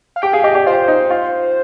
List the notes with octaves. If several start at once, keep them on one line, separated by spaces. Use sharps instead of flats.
F5
G4 G5
G#4 F5
G4 D#5
G4 D5
F4 C5
D#4
F4